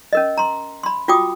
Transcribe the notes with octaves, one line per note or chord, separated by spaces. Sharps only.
C#4 A#4 D#5
A#5 C6
B5 C6
F4 F#4 G5 D6 D#6